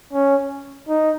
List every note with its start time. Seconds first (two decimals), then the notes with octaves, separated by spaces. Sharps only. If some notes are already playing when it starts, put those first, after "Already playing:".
0.13 C#4
0.89 D#4